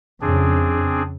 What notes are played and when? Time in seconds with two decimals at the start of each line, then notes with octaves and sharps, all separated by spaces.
0.21 F2 C#3 C4 D4 G#4